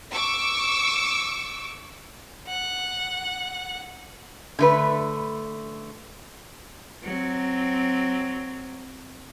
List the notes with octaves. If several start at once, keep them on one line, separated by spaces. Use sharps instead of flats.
C#6 D6 E6
F#5
D3 A3 B4
F#3 C4